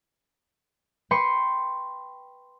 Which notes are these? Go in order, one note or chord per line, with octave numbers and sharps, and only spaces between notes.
B4 G5 C6 C#6